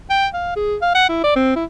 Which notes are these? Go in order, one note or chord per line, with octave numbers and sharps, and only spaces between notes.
G5
F5
G#4
F5
F#5
E4
D5
C4
E4